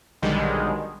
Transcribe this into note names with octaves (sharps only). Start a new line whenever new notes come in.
B1 D3 D#3 G3 G#3